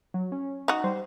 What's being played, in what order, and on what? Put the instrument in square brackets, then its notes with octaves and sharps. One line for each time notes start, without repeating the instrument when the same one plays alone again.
[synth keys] F#3
C#4
[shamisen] D#4 F#4
[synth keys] G3 C5